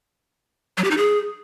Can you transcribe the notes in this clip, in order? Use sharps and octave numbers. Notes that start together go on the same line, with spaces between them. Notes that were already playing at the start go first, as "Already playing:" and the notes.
F#3
G4
D#4
G#4